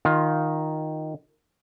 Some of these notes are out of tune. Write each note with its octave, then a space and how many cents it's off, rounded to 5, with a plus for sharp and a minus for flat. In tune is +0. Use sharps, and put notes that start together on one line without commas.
D#3 +0 F4 +15